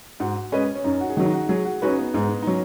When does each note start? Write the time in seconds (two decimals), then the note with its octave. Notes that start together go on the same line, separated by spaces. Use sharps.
0.20 G#2 F#4
0.52 G#3 C#4 B4 D#5
0.75 C#4
0.84 F#2 D#4
1.01 F#4
1.10 G#4
1.17 D#3 F#3 F#4
1.26 D#4
1.33 F#4
1.49 F#3 G#4
1.65 F#4
1.82 C#4 D#4 F#4 B4
1.98 B3
2.14 G#2 G#3
2.42 D#4
2.47 F#3 C#4